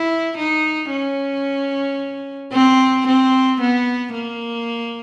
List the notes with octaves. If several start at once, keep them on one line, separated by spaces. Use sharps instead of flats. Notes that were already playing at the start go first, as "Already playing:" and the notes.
Already playing: E4
D#4
C#4
C4
C4
B3
A#3